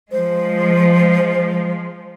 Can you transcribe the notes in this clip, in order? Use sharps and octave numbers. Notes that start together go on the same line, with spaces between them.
F3 G#3 C5